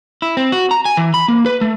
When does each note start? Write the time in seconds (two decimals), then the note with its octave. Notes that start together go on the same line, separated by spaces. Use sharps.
0.22 E4
0.37 C4
0.52 F#4
0.71 A#5
0.85 G#5
0.97 E3
1.14 B5
1.28 A#3
1.46 B4
1.61 A3